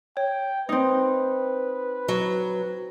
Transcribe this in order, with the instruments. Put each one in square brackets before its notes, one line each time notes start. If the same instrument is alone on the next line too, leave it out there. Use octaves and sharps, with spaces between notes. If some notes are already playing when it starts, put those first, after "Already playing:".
[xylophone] C#5 [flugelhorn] G5
[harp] C4 D#4 [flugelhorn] B4
[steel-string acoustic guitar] F#3